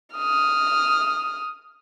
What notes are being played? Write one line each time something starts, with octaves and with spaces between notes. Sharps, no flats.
D#6 F6